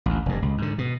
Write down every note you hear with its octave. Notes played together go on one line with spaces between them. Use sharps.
A1 D2
F1 G2
C#2
G#2 D3
B2